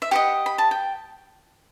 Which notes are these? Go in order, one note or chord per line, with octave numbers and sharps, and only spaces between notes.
E5
G4 B4 D#5 F#5
B5
A5
G5